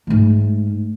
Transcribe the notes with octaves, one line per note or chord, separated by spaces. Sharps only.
G#2 A3